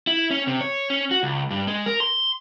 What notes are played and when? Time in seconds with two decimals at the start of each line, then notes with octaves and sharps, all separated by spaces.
0.07 E4
0.31 C#4
0.47 C3
0.61 C#5
0.90 C#4
1.11 F#4
1.23 C#2
1.50 G2
1.67 G#3
1.86 A#4
2.00 C6